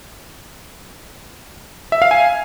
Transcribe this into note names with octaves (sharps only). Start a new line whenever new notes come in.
E5
F5
G#5